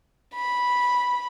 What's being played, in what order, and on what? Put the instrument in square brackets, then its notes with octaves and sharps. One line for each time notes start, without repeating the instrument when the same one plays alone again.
[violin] B5